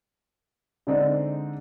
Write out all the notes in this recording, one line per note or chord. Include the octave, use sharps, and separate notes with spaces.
D3 G#3 C4 D4 D#4